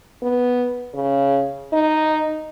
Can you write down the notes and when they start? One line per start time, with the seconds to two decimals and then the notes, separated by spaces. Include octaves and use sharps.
0.22 B3
0.94 C#3
1.73 D#4